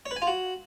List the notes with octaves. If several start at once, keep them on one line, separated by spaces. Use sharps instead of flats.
C#5
B4
G#5
F4
F#4